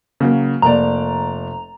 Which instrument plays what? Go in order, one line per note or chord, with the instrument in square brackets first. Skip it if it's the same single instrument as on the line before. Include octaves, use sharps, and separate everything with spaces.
[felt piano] C#3 F#3 A#3
[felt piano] F1 A#3 D5 [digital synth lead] A#5